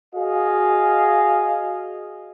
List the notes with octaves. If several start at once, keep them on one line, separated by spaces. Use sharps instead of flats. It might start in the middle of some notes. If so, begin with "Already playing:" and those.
F#4 G#4 D#5 F5